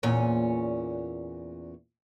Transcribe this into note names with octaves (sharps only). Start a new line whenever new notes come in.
E2 A#2 C#4